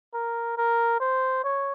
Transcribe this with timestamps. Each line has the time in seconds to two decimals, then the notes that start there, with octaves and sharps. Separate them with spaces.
0.14 A#4
0.57 A#4
1.00 C5
1.44 C#5